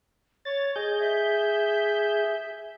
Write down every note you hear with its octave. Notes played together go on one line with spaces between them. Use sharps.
C#5 A6
G#4 D#5 G6
E5